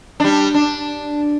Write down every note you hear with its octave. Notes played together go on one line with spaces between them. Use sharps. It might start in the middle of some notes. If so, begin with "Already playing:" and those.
G3 D4
D4